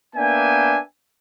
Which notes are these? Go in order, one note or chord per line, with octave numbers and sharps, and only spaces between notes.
A#3 B3 D4 E5 G5 G#5